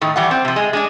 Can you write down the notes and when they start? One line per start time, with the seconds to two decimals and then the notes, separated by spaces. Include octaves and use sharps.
0.01 A2 D#3
0.16 E3 G3 F#5
0.31 C4
0.45 C3 F3
0.56 G#3
0.73 G#3 D4 G#4